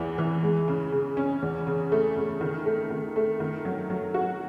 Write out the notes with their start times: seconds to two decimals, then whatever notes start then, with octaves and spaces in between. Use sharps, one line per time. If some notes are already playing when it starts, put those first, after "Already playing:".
Already playing: E2 E3
0.18 E3
0.43 G#3
0.68 C#3
0.92 C#3
1.17 C#4
1.42 E2
1.67 C#3
1.92 A3
2.16 C#3
2.41 D#3
2.66 A3
2.90 D#3
3.16 A3
3.40 D#3
3.65 F#3
3.90 F#3
4.14 F#4